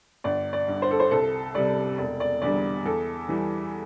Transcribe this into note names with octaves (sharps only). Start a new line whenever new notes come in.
G1 D5
D5
G2 D3
C5
A4
C5
C2 A4
C3 G3 D5
E1 D5
D5
E2 D3 G3 D5
E2 A4
E3 G3